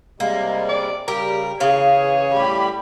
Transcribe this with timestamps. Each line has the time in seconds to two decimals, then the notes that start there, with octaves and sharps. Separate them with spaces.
0.20 C3 G3 G#3 A#3
0.69 D5
1.08 C#3 G3 G4 A#4
1.60 C#3 E3 G#4 C#5 F5
2.34 A2 G3 G4 B5